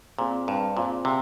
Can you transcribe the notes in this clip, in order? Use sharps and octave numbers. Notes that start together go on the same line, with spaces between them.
A#2 C4 F4 G#4 C5 F5
G2
A#2 C4 F4 G#4 C5 F5
C3